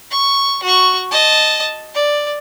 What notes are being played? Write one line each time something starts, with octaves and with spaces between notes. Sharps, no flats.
C#6
F#4 C#6
D#5 A5
D5